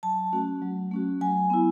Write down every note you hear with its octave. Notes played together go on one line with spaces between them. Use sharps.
F#3 A5
A3 C#4 F#4
F#3
A3 C#4 F#4
F#3 G#5
B3 E4